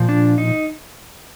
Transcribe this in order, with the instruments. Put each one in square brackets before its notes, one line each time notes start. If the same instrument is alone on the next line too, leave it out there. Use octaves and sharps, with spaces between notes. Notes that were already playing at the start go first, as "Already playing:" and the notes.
Already playing: [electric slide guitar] A#2 F3
D4
D#4